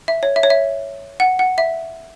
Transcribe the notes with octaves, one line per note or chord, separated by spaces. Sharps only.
E5
C#5
E5
C#5
E5
F#5
F#5
E5